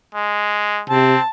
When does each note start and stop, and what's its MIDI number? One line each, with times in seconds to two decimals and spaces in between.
0.15 0.81 56
0.90 1.15 48
0.90 1.20 60
0.90 1.29 81